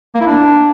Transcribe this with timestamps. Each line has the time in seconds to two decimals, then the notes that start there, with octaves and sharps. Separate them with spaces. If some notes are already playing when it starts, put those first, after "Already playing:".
0.15 A#3
0.21 E4
0.26 D4